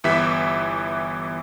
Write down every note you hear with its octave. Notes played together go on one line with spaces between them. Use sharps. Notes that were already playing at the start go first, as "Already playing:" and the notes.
G1 E3 B3 G4 E5 B6